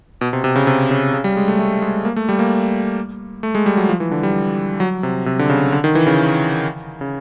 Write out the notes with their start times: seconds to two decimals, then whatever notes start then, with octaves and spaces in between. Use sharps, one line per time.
0.21 B2
0.33 C3
0.44 C3
0.56 C#3
0.67 C3
0.91 C#3
1.14 C#3
1.24 G3
1.37 G#3
1.48 A3
1.59 A3
1.82 G#3
2.05 A#3
2.16 A3
2.29 G3
2.39 A#3
3.43 A3
3.55 G#3
3.66 G3
3.77 F#3
3.89 F3
4.00 E3
4.11 D3
4.23 G3
4.80 F#3
5.03 C3
5.26 C3
5.39 D3
5.50 C#3
5.72 D3
5.84 D#3
5.95 E3
6.07 C#3
7.01 C#3